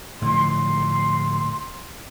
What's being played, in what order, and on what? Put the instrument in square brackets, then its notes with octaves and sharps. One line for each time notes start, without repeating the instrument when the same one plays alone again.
[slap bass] A2 D3 F3 [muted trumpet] C6